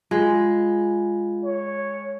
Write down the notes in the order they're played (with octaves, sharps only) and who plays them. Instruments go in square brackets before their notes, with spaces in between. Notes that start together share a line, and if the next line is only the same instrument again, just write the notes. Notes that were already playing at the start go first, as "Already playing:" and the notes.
[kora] G#3 [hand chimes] F4
[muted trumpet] C#5